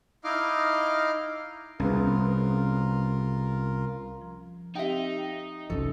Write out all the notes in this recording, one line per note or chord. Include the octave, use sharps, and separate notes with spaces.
D#4 E4 D#5 F5 D6 F6
C2 C#3 B3 F4 A#4
F3
C4 D#4 G4 E5 F5 G5
C2 F#2 B2 F3 C#4 A4